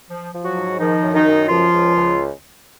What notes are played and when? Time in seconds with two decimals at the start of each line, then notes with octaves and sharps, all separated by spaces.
0.10 F3
0.33 F3
0.44 F#3 F#4
0.55 G#2
0.79 D#3 F3 D#4
1.02 F#2
1.14 D#3 D#4
1.26 F#2
1.48 C#2 F3 F4
1.73 C#2
1.95 C#2